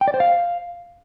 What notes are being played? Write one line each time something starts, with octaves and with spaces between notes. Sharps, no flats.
G5
D5
C5
F5